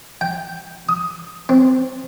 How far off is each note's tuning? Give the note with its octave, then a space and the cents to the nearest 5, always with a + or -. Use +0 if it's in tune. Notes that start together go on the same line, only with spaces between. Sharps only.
G5 -5
D#6 +30
C4 -15